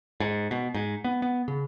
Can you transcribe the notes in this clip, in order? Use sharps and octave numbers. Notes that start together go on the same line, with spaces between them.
G#2
B2
G#2
B3
B3
C#3